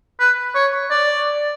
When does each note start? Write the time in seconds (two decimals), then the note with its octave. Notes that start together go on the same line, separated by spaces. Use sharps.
0.19 B4
0.55 C#5
0.90 D5